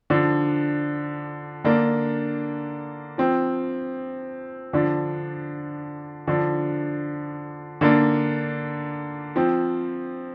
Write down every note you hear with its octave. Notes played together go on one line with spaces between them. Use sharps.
D3 F3 D4
D3 A#3 D4
F3 C4
D3 F3 D4
D3 F3 D4
D3 A#3 D4
F3 C4